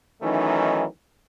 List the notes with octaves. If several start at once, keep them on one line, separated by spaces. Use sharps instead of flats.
D#3 E3 F#3 A3 C#4 D#4